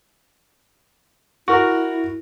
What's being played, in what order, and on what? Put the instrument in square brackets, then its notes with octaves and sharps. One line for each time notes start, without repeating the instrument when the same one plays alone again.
[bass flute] E4 [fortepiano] F#4 A#4